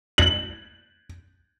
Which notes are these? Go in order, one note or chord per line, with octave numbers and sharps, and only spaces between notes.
F#7